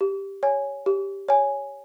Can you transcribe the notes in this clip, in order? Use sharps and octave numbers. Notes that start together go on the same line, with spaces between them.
G4
C#5 G#5
G4
C#5 G#5